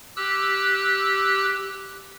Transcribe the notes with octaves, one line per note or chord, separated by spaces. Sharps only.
G4 E6 F#6